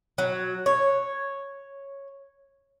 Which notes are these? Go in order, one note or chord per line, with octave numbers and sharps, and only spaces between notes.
F#3
C#5